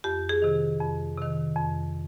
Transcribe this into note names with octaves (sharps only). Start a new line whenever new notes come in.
F2 G4
G#4
C3 D#3
F2
C3 D#3
F2